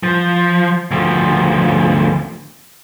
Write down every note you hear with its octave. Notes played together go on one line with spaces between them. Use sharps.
F3
D2 F3